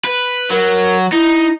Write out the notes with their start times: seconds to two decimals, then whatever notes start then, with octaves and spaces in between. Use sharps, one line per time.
0.05 B4
0.51 F#3 A#4
1.12 D#4 E4